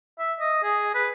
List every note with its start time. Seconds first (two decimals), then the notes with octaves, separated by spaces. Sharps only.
0.19 E5
0.40 D#5
0.63 G#4
0.95 B4